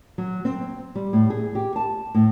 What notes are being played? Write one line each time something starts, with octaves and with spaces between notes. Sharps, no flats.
F#3
C4
G3
A2
G#4
G4
A5
A2